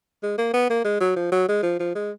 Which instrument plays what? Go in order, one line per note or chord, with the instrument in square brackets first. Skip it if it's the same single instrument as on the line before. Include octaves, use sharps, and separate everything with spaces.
[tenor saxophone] G#3
A#3
B3
A#3
G#3
F#3
F3
F#3
G#3
F3
F3
G#3